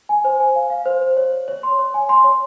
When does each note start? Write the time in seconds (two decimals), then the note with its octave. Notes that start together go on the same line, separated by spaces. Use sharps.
0.09 G#5
0.25 C5
0.40 G#5
0.56 F5
0.70 F5
0.86 C5
1.02 C5
1.17 C#5
1.32 C#5
1.48 C#5
1.63 C6
1.79 C#5
1.94 G#5
2.09 C6
2.24 C#5